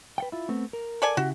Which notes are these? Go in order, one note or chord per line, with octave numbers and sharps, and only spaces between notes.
B4 F#5 G5
E4 F4
A3 B3 C4
A#4
A4 D5 G#5
C#3 E4 F#4 G4